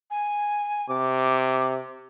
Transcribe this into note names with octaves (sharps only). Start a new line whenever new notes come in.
G#5
C3 D6